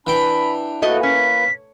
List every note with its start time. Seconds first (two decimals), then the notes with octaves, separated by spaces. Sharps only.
0.07 E3 D4 G5 B5
0.82 A3 A#3 F#4 B4 D#5
1.03 C#4 B6